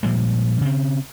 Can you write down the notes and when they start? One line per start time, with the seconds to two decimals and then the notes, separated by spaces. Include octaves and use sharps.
0.03 A#2 F3 G3 G#3
0.61 C#3 C4